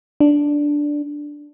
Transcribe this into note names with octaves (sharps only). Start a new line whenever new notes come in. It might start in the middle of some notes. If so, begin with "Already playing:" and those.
D4